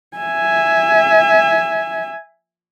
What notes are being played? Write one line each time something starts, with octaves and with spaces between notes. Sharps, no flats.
E5 G#5